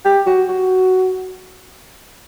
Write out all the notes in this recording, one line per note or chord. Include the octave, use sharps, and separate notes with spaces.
G4
F#4
F#4